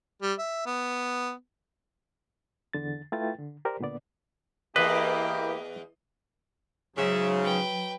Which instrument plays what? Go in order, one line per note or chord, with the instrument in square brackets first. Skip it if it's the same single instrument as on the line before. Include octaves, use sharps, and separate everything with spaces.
[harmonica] G3
E5
B3
[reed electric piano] E2 D3 A6
A3 E4 F4 B4 G5 A6
D3
G4 A#4 C5 D5
C#2 A#2 D3 B3 D5
[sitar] E2 [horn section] A#3 E4 G4 [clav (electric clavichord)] B4 [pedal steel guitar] D#5
[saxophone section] G#2 C#3 [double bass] F#3 [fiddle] E5
[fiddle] B4 G5